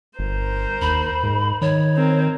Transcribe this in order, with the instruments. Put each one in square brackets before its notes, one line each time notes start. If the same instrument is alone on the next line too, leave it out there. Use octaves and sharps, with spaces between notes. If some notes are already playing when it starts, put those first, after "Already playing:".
[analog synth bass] G1 [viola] A#4 C5
[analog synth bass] D#2 [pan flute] B5
[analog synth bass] G#2
[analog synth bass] D#3 [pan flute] C#5
[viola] C4 A#4